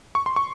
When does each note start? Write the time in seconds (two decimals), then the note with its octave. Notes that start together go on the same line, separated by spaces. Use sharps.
0.15 C#6
0.26 C6
0.36 C#6